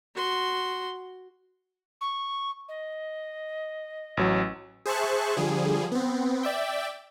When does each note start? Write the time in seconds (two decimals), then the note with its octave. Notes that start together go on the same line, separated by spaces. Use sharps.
0.16 F#4 C6
2.01 C#6
2.68 D#5
4.17 A1 F#3
4.86 G#4 C5 E5 A5 C#6 F#6
5.37 D3 F3 G3 G#4
5.92 B3 C4
6.43 D5 E5 G5